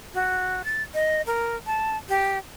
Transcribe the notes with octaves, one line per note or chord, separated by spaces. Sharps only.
F#4
A6
D#5
A#4
A5
G4